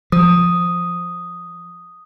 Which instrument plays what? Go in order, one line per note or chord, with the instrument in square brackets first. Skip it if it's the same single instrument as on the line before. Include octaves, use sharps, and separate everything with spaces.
[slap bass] F3 [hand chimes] D#6